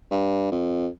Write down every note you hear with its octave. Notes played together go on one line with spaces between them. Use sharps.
G2
F2